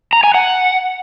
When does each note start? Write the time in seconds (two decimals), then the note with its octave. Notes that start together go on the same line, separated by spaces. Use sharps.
0.13 A#5
0.24 G#5
0.34 F#5